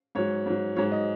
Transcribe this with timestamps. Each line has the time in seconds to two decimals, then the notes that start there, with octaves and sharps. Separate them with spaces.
0.15 G#2 F#3 C#5
0.46 G#2 F#3
0.76 G#2 F#3 C#5
0.92 D#5